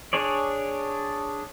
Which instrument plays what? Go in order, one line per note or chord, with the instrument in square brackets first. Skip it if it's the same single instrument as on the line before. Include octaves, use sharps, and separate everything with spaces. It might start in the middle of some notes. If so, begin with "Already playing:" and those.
[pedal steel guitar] D4 G#4 C#5 D5